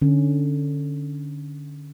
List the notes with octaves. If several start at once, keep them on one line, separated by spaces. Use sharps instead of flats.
D3 C#4